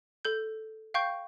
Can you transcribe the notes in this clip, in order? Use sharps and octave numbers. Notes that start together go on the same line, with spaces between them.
A4 G6
F5 G5 C#6 G6